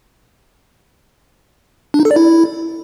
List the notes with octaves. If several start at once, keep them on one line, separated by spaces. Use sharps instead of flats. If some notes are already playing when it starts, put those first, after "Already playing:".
D4
D#4
A4
D5
E4